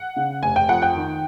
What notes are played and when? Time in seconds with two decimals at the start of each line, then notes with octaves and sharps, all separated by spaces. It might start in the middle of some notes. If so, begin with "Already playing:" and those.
Already playing: F#5
0.16 C#3
0.42 F1 G#5
0.56 G5
0.69 F2 F#5
0.82 G5
0.95 D#3